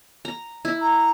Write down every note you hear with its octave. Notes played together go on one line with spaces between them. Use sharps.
A#5
E4
A#5